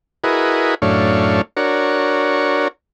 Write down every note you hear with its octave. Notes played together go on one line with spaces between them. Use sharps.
E4 F#4 G#4 A#4 B4 D#5
F#2 A2 A3 D4 C#5 F5
D4 F#4 A#4 C#5